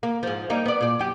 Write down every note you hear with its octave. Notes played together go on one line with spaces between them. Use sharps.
A#3
G#2 F3
G3 A#3 D#4
B3 D5
A#2 D5
F#2 G4